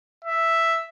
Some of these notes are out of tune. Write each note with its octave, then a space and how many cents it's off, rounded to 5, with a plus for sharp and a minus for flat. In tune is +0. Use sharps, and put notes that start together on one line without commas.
E5 +0